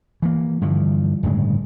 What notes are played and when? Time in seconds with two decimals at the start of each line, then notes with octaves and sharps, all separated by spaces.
0.22 E3 A#3
0.61 G2 D3 E3 F3
1.23 D1 G2 C#3 G#3